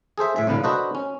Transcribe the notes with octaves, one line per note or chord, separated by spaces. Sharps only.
G#4 A4 C5 E5
A2 E5
C2 A2 D3 B4 F5
D4 F#4 A4 B4 C5 D#5
C#4